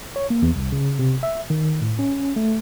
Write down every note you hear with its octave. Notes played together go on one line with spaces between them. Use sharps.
C#5
A#3
E2
C2
C#3
C3
E5
D#3
A2
C#4
A3